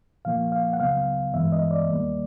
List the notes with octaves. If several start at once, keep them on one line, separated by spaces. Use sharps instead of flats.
A#2 F3 A#3 F5
F5
F#5
C#2 C#3 F#3 B3 F5
G2 E3 G#3 B3 E5
D#5
D5
D#2 D#3 G3 A#3